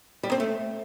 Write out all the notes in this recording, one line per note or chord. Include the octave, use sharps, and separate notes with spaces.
G3
C4
A3